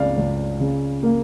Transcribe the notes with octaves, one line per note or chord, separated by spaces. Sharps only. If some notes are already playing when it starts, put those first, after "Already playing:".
Already playing: C#2 C#3 D5 F5
C#2
C#3
A#3